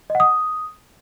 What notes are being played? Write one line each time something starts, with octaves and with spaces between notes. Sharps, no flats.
D#5
F#5
D#6